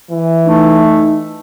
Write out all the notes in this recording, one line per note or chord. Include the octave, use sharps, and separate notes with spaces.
E3
A3 D#4